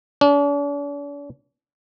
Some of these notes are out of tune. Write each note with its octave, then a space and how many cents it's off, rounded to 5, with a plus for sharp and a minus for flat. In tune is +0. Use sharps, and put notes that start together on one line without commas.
D4 -45